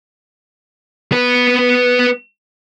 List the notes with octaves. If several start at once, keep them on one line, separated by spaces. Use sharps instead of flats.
B3 B4